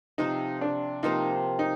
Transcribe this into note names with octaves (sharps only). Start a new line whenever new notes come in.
C3 F3 C4 D#4
D4
C3 F3 A#3 D#4 F4
D#4